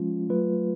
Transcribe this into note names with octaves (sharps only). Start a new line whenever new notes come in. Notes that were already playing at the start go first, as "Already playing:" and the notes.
Already playing: F3 G#3 C#4 F4
F#3 A3 F4 B4